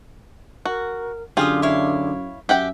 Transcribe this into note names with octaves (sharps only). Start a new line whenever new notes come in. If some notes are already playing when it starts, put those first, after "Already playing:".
F#4 A#4
F#2 D3 F4 G4 G#4 F5 D#6
E4 C#5 F5
F#2 C#4 G4 E5 F#5 G5